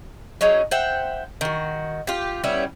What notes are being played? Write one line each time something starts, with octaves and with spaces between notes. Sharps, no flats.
F#3 C#4 D#4 G#4
C5 E5 F#5 G5
D#3 F#4
F4 G4
G3 B3 C#4 E4